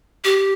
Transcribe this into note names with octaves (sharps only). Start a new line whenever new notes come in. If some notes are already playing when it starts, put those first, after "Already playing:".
G4